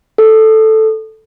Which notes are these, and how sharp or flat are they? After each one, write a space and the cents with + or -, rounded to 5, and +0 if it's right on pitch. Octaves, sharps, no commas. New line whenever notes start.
A4 +0